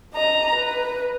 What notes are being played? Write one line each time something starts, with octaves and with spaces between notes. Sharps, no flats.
D#5 A#5
B4